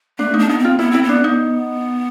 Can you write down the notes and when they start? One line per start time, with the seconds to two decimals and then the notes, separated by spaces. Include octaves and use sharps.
0.19 A3 D4
0.34 D#4
0.39 D4
0.49 B3 D#4
0.59 C4
0.65 F4
0.79 B3 E4
0.91 C4 E4
1.03 B3
1.09 D4
1.24 D#4